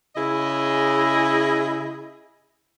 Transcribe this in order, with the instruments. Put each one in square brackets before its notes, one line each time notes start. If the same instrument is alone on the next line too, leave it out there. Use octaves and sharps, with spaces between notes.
[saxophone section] C#3 E4 G#4 D#5